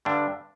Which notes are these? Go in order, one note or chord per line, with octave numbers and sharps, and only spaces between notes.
G2 D3 G3 D4